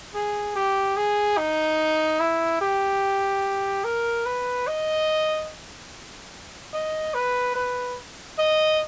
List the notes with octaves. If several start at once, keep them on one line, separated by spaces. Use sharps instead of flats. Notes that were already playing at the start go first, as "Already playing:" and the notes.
G#4
G4
G#4
D#4
E4
G4
A#4
B4
D#5
D#5
B4
B4
D#5